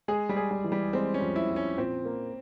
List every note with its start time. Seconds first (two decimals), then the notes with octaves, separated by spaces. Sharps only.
0.08 G#3 G#4
0.29 G3
0.37 G#4
0.51 G3
0.64 E3
0.72 G3
0.93 G#3 C4
1.14 C#4
1.21 F2
1.36 E4
1.49 F2
1.56 C#4
1.77 A#2 C4
2.05 A#3